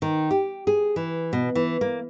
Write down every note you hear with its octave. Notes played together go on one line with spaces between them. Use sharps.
D#3
G4
G#4
E3
B2
E3
A#3